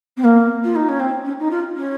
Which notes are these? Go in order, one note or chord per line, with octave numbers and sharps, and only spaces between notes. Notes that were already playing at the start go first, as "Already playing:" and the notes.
C4
A#3
F4
D#4
C#4
C4
C#4
D#4
F4
C#4